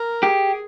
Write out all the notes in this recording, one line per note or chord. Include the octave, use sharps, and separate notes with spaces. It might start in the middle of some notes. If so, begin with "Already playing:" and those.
Already playing: A#4
G4 G#4